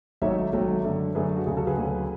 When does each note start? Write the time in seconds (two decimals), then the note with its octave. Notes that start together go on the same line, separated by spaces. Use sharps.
0.22 G#1 G#2 F#3 A3 C#5 E5
0.53 G#1 G#2 F#3 A3
0.84 F#2 D3 A3
1.15 F#2 D3 A3 G#4 B4
1.36 F#4
1.46 D2 C#3 F#3 G#4
1.57 F#4 A4
1.67 G#4 B4
1.77 D2 C#3 F#3